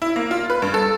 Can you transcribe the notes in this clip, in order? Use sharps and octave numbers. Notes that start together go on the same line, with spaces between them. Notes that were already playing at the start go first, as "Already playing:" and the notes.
E4
A#3
F4
B4
G2
A4